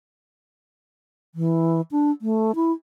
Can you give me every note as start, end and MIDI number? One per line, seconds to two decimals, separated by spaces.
1.35 1.81 52
1.91 2.11 62
2.22 2.52 57
2.55 2.71 64